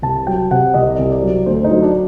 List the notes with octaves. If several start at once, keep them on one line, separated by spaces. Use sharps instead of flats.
C2 A5
F#3 G5
C3 F#5
C2 D#5
C2
D5
F#3
D2 C5
D#4
F#3
D4